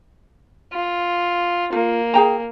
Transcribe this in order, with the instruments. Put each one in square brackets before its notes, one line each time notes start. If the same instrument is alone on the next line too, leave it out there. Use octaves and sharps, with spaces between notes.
[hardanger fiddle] F4
[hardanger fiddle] A#3 [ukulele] F4
[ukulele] G#4 G5 A#5